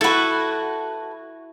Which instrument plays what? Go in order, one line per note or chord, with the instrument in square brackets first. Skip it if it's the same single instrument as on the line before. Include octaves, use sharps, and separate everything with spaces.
[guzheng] E4 F#4 [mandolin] A4 B4